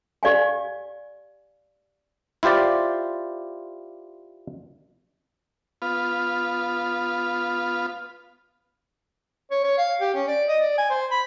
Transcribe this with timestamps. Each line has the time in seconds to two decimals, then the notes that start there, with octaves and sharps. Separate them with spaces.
0.23 G4 D5 F5 G#5
2.43 E4 F4 G4 C5 D5
5.82 B3 F4
9.51 C#5
9.64 C#5
9.78 F5
10.01 G4
10.15 C#4
10.28 D5
10.48 D#5
10.60 D5
10.78 G#5
10.91 C5
11.11 B5